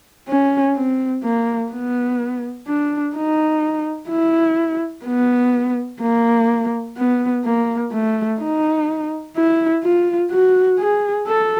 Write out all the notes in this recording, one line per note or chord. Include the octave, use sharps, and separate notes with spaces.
C#4
C4
A#3
B3
D4
D#4
E4
B3
A#3
B3
A#3
A3
D#4
E4
F4
F#4
G#4
A4